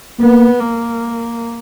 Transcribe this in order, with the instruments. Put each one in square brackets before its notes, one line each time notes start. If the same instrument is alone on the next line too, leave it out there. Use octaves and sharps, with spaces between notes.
[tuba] A#3 [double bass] B3
[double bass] A#3